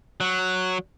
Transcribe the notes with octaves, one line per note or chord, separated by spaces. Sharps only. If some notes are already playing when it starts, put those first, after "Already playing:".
F#3